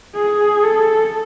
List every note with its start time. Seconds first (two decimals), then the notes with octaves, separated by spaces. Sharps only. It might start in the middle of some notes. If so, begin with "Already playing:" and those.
0.16 G#4
0.63 A4